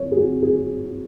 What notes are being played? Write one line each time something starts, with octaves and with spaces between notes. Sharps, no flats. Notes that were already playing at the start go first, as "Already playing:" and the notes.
Already playing: C#5
G#4
F#4
G#4